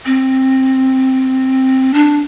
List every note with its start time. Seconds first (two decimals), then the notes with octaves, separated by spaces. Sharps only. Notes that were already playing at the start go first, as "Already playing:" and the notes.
0.06 C4
1.94 D4